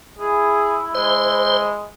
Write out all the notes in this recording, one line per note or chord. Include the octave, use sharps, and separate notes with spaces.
E4 G#4
G#3 C5